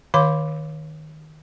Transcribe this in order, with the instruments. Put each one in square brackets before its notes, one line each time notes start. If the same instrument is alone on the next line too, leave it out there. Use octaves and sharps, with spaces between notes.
[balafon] D#3 C#5 F5 B5 D6